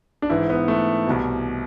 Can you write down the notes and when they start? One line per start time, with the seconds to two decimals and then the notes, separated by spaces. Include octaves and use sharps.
0.22 D4
0.30 G#2 E3 E4
0.50 B3
0.68 A3
1.07 C2 B2